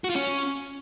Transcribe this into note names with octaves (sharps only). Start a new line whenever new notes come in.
F#4
F4
C#4